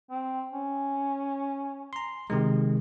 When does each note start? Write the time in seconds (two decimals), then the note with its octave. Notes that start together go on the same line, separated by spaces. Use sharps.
0.10 C4
0.52 C#4
1.93 A#5 C6
2.30 C3 D#3 G#3